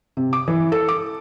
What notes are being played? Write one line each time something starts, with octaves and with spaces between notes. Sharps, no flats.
C3
D6
E3
A4
D6